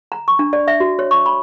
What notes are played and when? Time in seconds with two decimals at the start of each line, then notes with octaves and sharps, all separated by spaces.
0.12 A#5
0.28 C#6
0.39 D4
0.53 D5
0.68 E5
0.80 F#4
0.99 C#5
1.11 C#6
1.26 B5